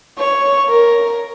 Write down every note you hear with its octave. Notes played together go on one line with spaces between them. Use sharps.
C#5
A#4